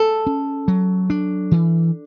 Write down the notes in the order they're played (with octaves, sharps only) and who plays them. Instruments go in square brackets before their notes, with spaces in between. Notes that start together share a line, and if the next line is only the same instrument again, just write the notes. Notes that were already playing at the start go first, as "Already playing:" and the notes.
Already playing: [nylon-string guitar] A4
[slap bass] C#4
F#3
D4
E3